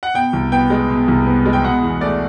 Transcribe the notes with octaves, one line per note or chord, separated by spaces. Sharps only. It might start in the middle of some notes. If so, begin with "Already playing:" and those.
F#5
B2 G5
C2
B3 G5
G#3
B2
C2
B3
G#3
G5
B2 F#5
E2
A3 D5